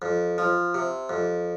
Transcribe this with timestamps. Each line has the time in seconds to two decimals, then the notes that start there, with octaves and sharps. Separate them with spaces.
0.02 F2
0.38 F3
0.74 C3
1.09 F2